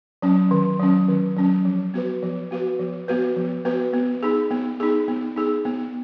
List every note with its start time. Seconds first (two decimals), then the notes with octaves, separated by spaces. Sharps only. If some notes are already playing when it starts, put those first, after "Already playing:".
0.22 F#3 C#4
0.51 D#3
0.80 F#3 C#4
1.08 D#3
1.37 F#3 C#4
1.65 F3
1.94 B3 F#4 B4
2.22 F3
2.51 B3 F#4 B4
2.80 F3
3.08 B3 F#4 B4
3.36 F3
3.65 B3 F#4 B4
3.93 B3
4.23 D#4 G#4
4.51 B3
4.80 D#4 G#4
5.08 B3
5.36 D#4 G#4
5.65 B3